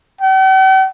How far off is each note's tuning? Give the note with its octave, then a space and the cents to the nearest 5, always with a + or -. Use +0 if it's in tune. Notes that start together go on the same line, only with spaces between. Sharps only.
G5 -45